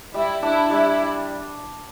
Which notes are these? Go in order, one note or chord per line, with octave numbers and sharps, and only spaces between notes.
G3 E4
D4 E4
G3 E4